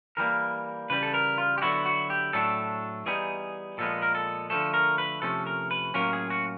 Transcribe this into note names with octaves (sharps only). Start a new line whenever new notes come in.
E3 G3 A#3 A#4
C#3 E3 G3 B4
A4
A#4
F4
G4
D3 F#3 B3 E4 F#4
F#4
G4
A2 F#3 A3 D4 A4
E3 G3 B3 D#4 G#4
A#2 F3 G#3 B3 A4
A#4
A4
D3 F3 A3 A4
A#4
B4
C3 F3 A3 C#4 A4
A#4
B4
A2 F#3 A#3 C#4 F4 A#4
G#4
F#4